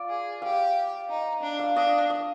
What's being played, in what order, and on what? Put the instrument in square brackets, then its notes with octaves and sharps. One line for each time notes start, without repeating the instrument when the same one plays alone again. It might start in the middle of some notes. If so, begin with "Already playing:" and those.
Already playing: [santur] F4 D5
[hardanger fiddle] G#4
[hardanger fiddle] G4 [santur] F5
[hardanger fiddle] D#4
D4
[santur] F5
[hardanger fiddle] D4 [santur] D#5
[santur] D#5